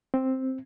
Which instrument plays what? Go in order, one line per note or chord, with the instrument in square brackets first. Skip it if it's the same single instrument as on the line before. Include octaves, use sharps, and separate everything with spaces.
[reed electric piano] C4